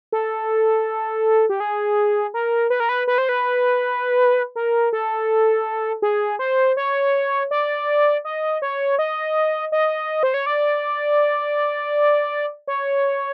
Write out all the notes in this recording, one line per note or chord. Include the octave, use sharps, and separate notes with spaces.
A4
G4
G#4
A#4
B4
A#4
B4
B4
C5
B4
A#4
A4
G#4
C5
C#5
D5
D#5
C#5
D#5
D#5
C5
C#5
D5
C#5